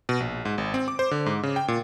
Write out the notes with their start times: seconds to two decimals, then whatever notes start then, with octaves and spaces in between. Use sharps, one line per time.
0.09 B2
0.20 A#1
0.45 G#2
0.58 G#1
0.74 C4
0.88 D6
0.99 C5
1.11 D3
1.26 G#2
1.43 C#3
1.56 G5
1.68 A#2